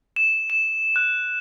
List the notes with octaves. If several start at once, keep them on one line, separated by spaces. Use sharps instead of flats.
E7
E7
F#6